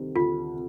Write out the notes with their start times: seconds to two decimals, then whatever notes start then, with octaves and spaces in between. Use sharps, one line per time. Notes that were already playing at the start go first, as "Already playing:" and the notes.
Already playing: D2 C3 D#3 G3 C4
0.16 D2 F4
0.53 C3